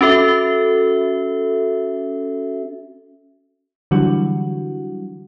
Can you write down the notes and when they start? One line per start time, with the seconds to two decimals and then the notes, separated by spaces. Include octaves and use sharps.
0.01 C#4 F#4 A4 E5
3.91 D3 E3 F#3 G3 F#4